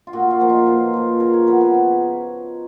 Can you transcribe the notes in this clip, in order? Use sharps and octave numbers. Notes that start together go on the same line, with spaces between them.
F4
A#2 F#4
F4
F3 A#3
D#4
A#2 B4
F3 A#3
C#3 A#4
C#5
F3 B3 B4
B4
C#3